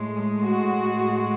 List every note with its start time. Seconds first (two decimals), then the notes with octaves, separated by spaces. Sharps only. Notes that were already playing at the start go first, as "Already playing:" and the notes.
Already playing: A2 G#3
0.45 F#4